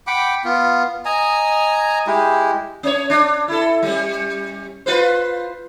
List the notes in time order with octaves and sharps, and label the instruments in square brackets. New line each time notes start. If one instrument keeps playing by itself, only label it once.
[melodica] F#5 G5 B5 D6
B3 F4
D#5 G#5 A#5
G#3 E4 G4
[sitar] C#4 C#5
D4
E4 A4
G3 C#4
F4 B4 C5